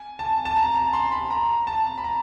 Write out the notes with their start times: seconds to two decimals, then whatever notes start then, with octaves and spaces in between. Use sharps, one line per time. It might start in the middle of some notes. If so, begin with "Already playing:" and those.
Already playing: G#5
0.19 A5
0.45 A5
0.56 A#5
0.75 A#5
0.93 C6
1.12 B5
1.31 A#5
1.67 A5
1.98 B5
2.04 A#5